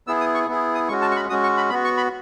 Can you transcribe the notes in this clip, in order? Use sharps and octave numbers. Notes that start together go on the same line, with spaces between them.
B3 E4 G#4 E6
D#6
C#6
B3 E4 G#4
D#6
G#3 C#4 F#4 C#6
A5
C#6
B5
G#3 C#4 F#4 D#6
C#6
B5
B3 F#4 B5
C#6
B5